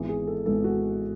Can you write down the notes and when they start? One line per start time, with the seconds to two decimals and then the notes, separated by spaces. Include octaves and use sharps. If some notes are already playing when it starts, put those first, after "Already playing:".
Already playing: G#1 G#2 E3 G#3 B3
0.09 G#4
0.27 A4
0.46 G#1 G#2 E3 G#3 B3 A4
0.64 F#4